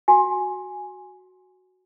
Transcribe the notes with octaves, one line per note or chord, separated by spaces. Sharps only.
F#4 G#5